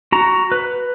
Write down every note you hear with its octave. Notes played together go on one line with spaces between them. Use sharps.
F#4 A#5
B4